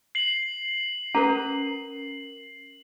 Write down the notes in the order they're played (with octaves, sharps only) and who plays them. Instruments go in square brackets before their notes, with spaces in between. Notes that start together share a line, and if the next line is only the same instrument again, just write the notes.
[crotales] C7 F#7
[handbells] C#4 A#4 [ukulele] B4 A#5